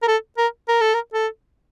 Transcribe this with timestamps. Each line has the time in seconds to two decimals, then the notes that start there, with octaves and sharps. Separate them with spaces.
0.02 A#4
0.08 A4
0.38 A#4
0.68 A#4
0.81 A4
0.94 A#4
1.13 A4